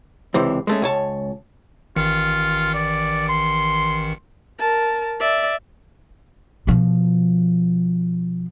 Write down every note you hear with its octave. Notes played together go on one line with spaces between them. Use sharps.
C#2 C3 E3 C4
G#3 A3 C#4
C#2 C#5 A5
A1 D#3 F4 C#7
D5
C6
A#4 A5
D5 E5
B2 F3